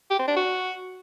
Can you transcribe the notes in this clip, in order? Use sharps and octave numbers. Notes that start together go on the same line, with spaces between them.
G4
C4
D4
F#4